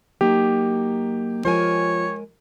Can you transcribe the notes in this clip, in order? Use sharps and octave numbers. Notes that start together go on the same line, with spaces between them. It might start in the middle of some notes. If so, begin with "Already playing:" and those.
F#3 A#3 D#4 G4
F3 G#3 A#4 C#5 G#5